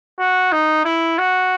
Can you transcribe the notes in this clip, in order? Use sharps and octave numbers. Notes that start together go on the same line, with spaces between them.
F#4
D#4
E4
F#4